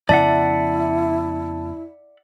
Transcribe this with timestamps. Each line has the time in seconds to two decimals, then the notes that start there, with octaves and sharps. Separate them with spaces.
0.09 F2 C#3 B3 E4 D5 E5 F#5 A5